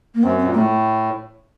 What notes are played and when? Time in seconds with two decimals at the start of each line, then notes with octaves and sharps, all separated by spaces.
0.15 A#3
0.23 F#2 C4
0.39 C4
0.45 A#2
0.54 A2 A3